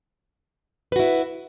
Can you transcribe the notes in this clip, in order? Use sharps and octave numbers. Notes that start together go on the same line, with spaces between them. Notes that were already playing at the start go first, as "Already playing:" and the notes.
E4 F#4 B4